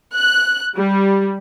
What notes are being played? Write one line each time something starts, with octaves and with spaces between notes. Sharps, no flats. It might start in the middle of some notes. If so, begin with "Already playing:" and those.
F#6
G3